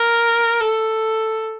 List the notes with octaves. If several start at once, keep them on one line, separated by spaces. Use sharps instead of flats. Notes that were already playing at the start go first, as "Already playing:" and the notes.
Already playing: A#4
A4